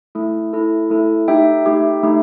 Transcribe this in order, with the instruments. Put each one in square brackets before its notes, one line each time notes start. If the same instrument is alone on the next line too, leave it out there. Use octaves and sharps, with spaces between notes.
[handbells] A3 E4 A4
A3 E4 A4
A3 E4 A4
A3 D#4 G4 E5 G5
A3 D#4 G4
A3 D#4 G4